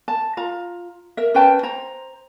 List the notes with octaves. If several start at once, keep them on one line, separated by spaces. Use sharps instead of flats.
A5
F4 A#5
A#4 E5
C#4 B4 G5 A5
C5 A#5